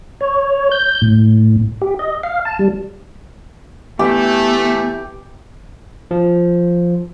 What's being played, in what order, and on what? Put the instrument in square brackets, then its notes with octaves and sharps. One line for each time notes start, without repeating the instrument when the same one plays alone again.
[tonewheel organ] C#5
G6
A2
G4
D#5
F5
A5
G3
[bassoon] E3 [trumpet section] A3 [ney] B3 [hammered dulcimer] G4
[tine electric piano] F3